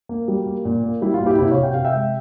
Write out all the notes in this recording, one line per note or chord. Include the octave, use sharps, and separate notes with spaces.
A#3
G3
A#3
A#2
A#3
G3 E4
F4
A#2
E4 G4
C3 E4 G4
C#5 F5
C3
G5
C3 F5
E5 G5
G#3